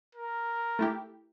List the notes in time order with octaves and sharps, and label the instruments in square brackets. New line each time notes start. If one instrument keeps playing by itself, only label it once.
[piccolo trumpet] A#4
[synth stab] A3 E4 G4